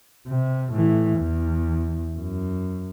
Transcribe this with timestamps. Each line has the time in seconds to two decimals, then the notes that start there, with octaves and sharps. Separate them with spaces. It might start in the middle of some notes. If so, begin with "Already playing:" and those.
0.28 C3
0.72 A2 E3
1.18 E2
2.16 F#2